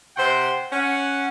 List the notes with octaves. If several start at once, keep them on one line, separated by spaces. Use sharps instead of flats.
C3 C5 F#5 G5 C6
C#4 F#5